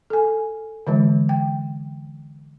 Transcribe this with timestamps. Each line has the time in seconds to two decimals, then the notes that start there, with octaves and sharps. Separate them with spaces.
0.10 A4 G#5
0.87 D3 E3 G#3
1.29 G5